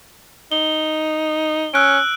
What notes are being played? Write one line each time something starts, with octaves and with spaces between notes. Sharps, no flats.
D#4 G7
C#4 E6 F#6 D7